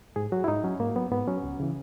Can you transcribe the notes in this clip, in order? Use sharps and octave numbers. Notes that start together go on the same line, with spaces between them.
G#2 G#4
F#3 F#4
E4
G#2 D#4
F#3 C#4
G#2 A#3
F#3 B3
G#2 B3
F#3 C#4
C#2
C#3 E3